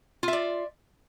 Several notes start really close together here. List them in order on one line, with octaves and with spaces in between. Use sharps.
F4 E5 D5